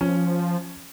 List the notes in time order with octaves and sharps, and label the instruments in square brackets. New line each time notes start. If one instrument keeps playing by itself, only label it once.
[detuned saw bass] F3 [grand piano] C#4